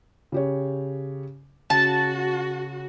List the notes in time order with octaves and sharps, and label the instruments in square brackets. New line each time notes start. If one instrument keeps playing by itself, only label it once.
[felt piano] C#3 G4 C#5
[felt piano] C#3 [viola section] F#4 [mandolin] A5